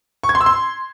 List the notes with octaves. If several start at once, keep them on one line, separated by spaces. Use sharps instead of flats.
C#6
G#6
C6
E6
C6